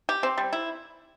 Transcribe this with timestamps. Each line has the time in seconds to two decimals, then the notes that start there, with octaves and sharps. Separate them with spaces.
0.09 G4
0.23 C4
0.38 G3
0.53 E4